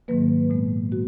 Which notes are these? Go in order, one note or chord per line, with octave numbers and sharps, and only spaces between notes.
G#2 D#3 F#3 A#3 B4
A#2 G#3 B3
B3 F#4